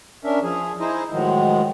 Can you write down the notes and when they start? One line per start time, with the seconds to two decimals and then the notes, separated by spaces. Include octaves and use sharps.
0.24 C#4 D4 A#4 E5
0.43 F3 G#4
0.80 D#4 E4 G#4 C5 D#5
1.11 A2 D#3 F3 F#3 G#3